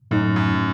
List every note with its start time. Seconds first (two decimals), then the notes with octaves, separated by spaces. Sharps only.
0.11 F#2 A2 F#3 A3 D#4
0.36 F#2